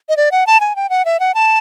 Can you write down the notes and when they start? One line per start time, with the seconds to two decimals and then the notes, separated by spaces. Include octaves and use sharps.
0.09 D#5
0.17 D5
0.32 F#5
0.47 A5
0.60 G#5
0.76 G5
0.90 F#5
1.05 E5
1.20 F#5
1.35 A5